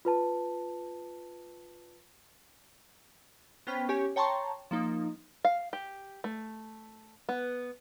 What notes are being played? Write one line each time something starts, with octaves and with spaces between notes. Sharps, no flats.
F4 B4 A5
B3 C#4 C5 G5 F6 B6
C#4 G4 C#5 G#5
C#5 G5 A5 A#5 C6 C#6
F3 A#3 D#4
F5
G4
A3
B3